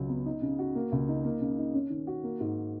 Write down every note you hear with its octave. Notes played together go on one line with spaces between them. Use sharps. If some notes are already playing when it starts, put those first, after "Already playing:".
Already playing: C#2 F#3
B3
D#4
C#3
F#4
A#3
C#2
D#4
A#3
C#3
D#4
C#4
D#3
F#4
A#3
G#2